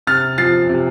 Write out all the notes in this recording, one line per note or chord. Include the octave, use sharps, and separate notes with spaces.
C3 F6 A6
F3 A6 C7
C3